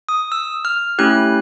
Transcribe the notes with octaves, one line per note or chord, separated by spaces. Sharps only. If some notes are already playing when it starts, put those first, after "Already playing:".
D#6
E6
F6
A3 C#4 E4 G4 F#6